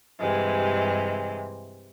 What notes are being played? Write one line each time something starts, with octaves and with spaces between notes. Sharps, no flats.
G2 C3 E3 G#3